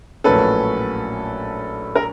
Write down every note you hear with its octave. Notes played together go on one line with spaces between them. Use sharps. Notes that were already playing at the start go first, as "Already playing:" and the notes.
A#1 A2 F#3 A#3 C#4 A4 B4
A#4